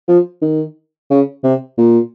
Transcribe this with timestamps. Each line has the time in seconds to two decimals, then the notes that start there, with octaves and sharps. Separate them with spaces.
0.08 F3
0.42 D#3
1.11 C#3
1.44 C3
1.78 A#2